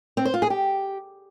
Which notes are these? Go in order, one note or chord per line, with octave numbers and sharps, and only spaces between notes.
C4
C5
F4
G#4
G4